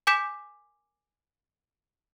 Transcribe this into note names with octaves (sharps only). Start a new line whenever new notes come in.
G#5 D6 G6 B6 E7